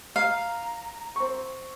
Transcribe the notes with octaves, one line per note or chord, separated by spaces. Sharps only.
F5 A#5
C4 C#6